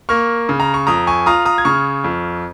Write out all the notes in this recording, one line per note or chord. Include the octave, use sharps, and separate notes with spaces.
A#3 C#6 F6
C#3
A#5
C#6
F2 A#5 D#6
G#5 C#6
F4 A#5 D#6
A#5 D#6
G#6
C#3 C#6 F6
F2